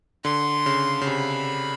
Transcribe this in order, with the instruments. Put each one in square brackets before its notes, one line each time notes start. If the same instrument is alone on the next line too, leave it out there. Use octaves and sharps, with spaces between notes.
[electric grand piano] D3 [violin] C6
[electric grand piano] C#3
C#3
[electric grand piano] C3 [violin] B5